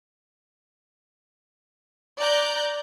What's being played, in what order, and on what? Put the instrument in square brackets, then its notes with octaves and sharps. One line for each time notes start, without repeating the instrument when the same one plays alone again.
[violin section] D5 A#5 F#6 G6